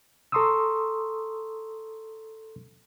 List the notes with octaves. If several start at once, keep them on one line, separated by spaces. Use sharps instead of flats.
A4 A#5 C6 C#6 D#6 E6